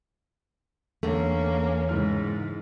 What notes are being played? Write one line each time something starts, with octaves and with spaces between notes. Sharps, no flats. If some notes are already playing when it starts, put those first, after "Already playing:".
E2 D3 A3 A#3 C#4
G#2 C#3 E3 F6